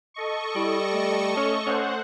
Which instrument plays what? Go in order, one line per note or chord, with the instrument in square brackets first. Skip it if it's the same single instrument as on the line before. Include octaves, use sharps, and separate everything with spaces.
[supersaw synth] A4 D#5 C#6
[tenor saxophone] G3 [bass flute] E4
[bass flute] A3
[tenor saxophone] C#4
[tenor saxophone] C#4 [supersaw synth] C5 F#5